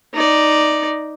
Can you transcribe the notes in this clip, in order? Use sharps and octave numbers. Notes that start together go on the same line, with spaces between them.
D#4 D5